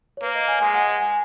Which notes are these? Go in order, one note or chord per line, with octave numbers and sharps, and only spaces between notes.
C#5
A#3 B4
D#5
G#5
G#3 G#5
F#5
G#5
G#5